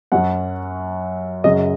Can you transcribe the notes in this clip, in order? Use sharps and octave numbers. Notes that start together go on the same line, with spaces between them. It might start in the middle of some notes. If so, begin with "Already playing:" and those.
F#2 F#3 F#5
F#2 C#3 F#3 D#5